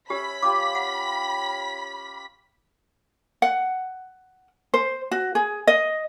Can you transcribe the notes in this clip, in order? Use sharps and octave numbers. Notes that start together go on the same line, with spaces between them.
C#4 G4 E5 B5 B6
F4 G4 F5 D6
F#5
F#5
C5
F#4
G#4
D#5